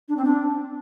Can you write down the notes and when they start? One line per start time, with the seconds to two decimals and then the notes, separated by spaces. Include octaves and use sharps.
0.09 D4
0.17 C4
0.25 D4